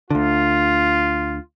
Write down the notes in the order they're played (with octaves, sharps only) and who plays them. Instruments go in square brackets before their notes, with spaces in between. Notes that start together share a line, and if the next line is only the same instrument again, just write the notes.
[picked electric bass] D2 D3 [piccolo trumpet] F4